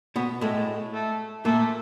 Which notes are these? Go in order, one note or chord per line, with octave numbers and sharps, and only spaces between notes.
B2 B3
A2 G#3 A3
A3
A#2 A3 A#3